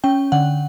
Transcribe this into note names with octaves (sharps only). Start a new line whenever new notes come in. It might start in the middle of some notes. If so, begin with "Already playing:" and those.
C#4 G5
D3 F#5